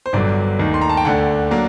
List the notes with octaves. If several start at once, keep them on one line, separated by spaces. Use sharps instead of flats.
C5
G1 G2 D3 F#3 D5
D#2 D#3 A3
C6
A#5
A5
G5
D2 D3 A3 D4 F#5
F#3 A#3 D4